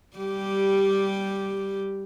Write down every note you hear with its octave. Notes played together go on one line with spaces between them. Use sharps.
G3 G4